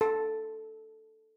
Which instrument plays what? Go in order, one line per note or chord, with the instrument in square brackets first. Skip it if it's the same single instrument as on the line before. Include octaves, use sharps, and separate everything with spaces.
[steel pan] A4